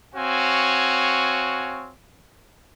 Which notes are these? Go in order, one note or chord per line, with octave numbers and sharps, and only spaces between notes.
C4 F#4 C#5 F5 G#5